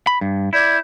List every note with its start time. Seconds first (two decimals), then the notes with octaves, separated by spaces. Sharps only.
0.07 B5
0.21 G2
0.53 E4 D5 G6 G#6